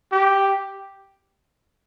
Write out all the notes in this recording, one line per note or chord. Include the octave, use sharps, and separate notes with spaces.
G4